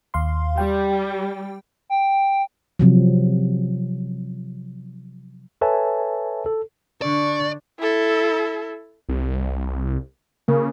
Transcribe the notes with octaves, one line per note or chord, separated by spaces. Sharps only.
D#2 F5 C6
G3 G5
G5
C3 F3 F#3
A4 B4 C#5 E5 G#5 A5
A4
D3 D4 D5 C#6
E4 A4
C2
C#3 A#3